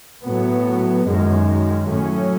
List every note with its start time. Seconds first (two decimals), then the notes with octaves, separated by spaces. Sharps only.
0.25 A2 F#3 B3
1.07 F#2 D#3 G#3
1.90 A2 F#3 C#4